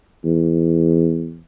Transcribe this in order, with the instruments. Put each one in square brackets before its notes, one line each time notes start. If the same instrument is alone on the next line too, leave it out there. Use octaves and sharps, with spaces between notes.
[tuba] E2